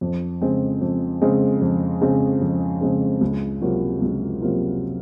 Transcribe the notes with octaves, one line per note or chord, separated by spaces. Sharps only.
F2
C#3 G#3 C4
F2
C#3 G#3 C4
F2
C#3 G#3 C4
F2
C#3 G#3 C4
C#2
C3 F#3 A#3 F4
C#2
C3 F#3 A#3 F4